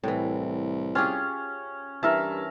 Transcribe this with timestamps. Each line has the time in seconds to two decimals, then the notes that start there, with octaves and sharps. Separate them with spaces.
0.04 C2 A2 E3
0.95 C#4 F4 G4 G#4
2.03 G2 E3 A#4 E5 A5